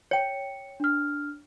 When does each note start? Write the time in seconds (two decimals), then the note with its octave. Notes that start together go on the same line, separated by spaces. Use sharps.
0.11 C#5 G5 C#7
0.80 D4 F6